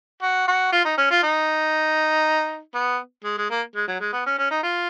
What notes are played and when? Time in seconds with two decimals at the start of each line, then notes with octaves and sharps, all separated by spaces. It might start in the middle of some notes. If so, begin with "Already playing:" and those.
0.22 F#4
0.48 F#4
0.72 F4
0.85 D#4
0.98 C#4
1.11 F4
1.23 D#4
2.75 B3
3.24 G#3
3.38 G#3
3.50 A#3
3.75 G#3
3.88 F#3
4.00 G#3
4.13 B3
4.26 C#4
4.38 C#4
4.51 D#4
4.63 F4